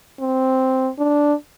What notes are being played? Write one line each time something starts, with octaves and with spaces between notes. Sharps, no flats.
C4
D4